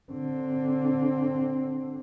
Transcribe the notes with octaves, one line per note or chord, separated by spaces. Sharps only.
D3 C4